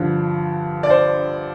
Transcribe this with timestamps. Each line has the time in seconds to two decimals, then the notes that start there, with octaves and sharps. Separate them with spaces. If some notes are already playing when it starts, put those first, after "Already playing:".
Already playing: G2 D3 F3
0.83 D5
0.90 C5